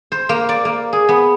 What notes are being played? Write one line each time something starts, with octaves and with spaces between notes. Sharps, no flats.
C5
A#3
D5
A#3
G#4
B3